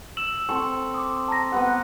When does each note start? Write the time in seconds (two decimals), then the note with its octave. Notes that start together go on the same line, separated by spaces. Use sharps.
0.17 E6 E7 F#7
0.49 C4 A4 C#6
0.94 D6 D#6
1.28 A5 A#5 A#6
1.52 B3 B4 F#5